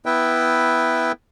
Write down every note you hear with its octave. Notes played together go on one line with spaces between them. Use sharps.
B3 E4 B4 E5 G5